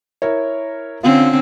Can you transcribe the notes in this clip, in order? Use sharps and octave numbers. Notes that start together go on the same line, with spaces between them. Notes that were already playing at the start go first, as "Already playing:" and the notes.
E4 A#4 C#5
D3 C4 C#4 F4